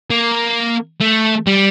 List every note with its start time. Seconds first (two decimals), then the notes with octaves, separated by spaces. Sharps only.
0.10 A#3
1.01 A3
1.47 G3